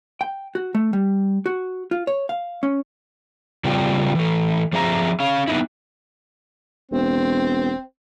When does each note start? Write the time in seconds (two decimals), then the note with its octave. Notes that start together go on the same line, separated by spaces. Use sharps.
0.21 G5
0.55 F#4
0.75 A3
0.93 G3
1.46 F#4
1.91 F4
2.07 C#5
2.29 F5
2.63 C#4
3.64 C#3 G3 C4 F4 D5 G5
4.15 E3 A3
4.73 F3 C4 G#4 E5 F#5 A#5
5.20 C#4 F5
5.47 B3 D#4 E4
6.91 E1 C4